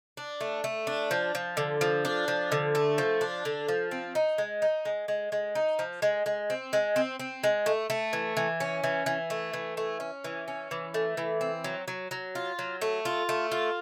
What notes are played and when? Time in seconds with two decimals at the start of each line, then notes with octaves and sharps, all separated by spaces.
0.17 D4
0.41 A3
0.64 A3
0.87 D4
1.11 F3
1.35 F3
1.57 D3
1.81 F3
2.05 D4
2.28 F3
2.52 D3
2.75 A3
2.98 F3
3.21 D4
3.45 D3
3.68 F3
3.91 C4
4.15 D#4
4.38 G#3
4.62 D#4
4.85 G#3
5.08 G#3
5.32 G#3
5.55 D#4
5.79 F3
6.02 G#3
6.26 G#3
6.50 C4
6.73 G#3
6.96 C4
7.19 C4
7.44 G#3
7.66 A3
7.90 A3
8.13 E3
8.37 E3
8.60 C#4
8.84 E3
9.06 E3
9.30 A3
9.53 E3
9.77 A3
10.00 C#4
10.24 E3
10.48 C#4
10.71 E3
10.94 A3
11.17 E3
11.41 C4
11.64 F#3
11.88 F#3
12.11 F#3
12.35 F4
12.59 F#3
12.81 A3
13.05 F4
13.29 A3
13.51 F4